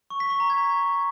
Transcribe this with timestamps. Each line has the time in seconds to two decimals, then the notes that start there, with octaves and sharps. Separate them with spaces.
0.10 C#6
0.20 B6
0.30 C#6
0.40 A#5
0.50 G#6